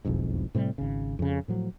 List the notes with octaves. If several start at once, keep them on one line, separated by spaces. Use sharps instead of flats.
E1 B1 F2 G#2
A2 C3 D#3 G3
G#1 C#3
F2 C#3
A2 F3 F#3